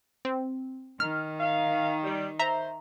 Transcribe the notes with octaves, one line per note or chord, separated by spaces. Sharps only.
C4
D#3 F6
F5
G3
C5 E5 A#5